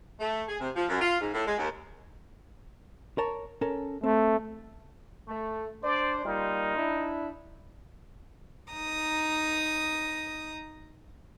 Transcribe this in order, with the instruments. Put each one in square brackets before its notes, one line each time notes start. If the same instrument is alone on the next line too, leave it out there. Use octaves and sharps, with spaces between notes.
[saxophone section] A3
G#4
C3
F3
F#2
F4
G#2
A2
G#3
D#2
[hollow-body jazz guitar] A#4 C#5 A5
C#4 A4 A#4
[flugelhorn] A3 [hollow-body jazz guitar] C4
[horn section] A3
[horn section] D4 C5 [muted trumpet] D5
[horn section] G3 A#3 F4 [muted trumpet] D#4
[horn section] D4 E4
[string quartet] D#4 A#5 D#6